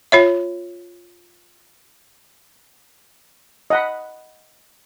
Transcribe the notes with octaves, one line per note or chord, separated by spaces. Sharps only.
F4 C#5 E5
D#5 F#5 B5